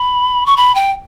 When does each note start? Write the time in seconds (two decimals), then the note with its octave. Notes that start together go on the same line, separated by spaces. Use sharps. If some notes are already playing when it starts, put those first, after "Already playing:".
Already playing: B5
0.46 C#6
0.57 B5
0.75 G5